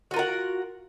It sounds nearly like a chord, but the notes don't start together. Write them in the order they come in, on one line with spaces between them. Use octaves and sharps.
F#4 F4 A#4 F#5